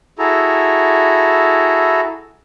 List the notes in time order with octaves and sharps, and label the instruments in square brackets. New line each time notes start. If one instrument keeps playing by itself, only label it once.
[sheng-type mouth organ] E4 F#4 G#4 A4 A#5